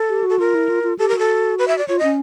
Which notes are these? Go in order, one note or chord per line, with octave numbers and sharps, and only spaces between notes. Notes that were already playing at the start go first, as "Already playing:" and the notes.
Already playing: A4
G4
F#4
A4
F4 A#4
E4
F4
F4
G4 A4
A#4
F#4 A4
B4
E5
D5
F4 C#5
D#5
C#4